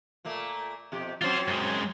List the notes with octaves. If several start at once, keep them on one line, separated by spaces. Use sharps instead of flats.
A#2 A3 A#3
F2 B2 G4
F#3 C4 C#4 F4 C5
F#2 G#3